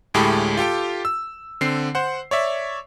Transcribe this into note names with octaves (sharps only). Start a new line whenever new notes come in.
D2 A2 G#3 G4 A4 B5
F4 G4 A4 G5
E6
D3 C4 C7
C5 F#5
C#5 D5 E5